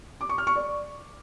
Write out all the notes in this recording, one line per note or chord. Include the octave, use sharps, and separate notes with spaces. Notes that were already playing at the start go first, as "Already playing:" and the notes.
D6
C#6
F6
C#6
D5